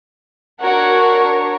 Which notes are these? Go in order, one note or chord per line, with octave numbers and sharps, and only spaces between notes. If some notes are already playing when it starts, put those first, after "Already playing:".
D4 F#4 A#4 C#5